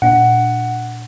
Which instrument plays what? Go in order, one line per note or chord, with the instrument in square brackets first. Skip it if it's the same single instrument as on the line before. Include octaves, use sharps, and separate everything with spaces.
[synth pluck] A#2 D4 [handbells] F#5